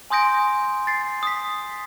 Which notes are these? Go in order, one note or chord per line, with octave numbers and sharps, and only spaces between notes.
G#5 C6 D#6 G6 A#6 D7
A6 C7
D#6 B6